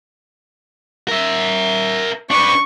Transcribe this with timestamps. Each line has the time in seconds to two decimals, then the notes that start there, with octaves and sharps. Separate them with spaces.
1.08 A#4 E5
2.31 D4 B4 C#6